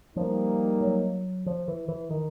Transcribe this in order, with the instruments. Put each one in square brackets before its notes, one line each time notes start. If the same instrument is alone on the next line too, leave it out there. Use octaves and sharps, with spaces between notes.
[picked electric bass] F3 [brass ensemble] G3 A#3 D#4
[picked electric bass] F#3
F3
E3
E3
D#3